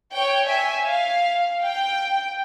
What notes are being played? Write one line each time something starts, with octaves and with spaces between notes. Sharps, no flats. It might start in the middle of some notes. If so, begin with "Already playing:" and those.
C#5 G5
E5 G#5
F5
G5